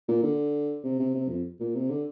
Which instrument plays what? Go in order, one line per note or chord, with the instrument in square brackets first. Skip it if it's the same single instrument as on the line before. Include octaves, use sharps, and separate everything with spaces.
[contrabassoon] A#2
D3
C3
C3
C3
F2
A#2
C3
D3